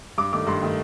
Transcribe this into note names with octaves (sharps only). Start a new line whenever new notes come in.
G2 D6
D#3 A3 D6
G2 C6
D#3 A3